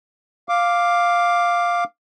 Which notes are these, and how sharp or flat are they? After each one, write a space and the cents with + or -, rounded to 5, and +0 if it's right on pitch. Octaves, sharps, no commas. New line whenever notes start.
F5 +0 D6 +0